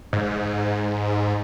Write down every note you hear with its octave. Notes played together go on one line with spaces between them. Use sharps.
G#2